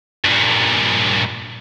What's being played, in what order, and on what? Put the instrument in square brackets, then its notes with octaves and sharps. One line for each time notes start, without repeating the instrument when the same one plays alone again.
[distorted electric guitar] G2 A#2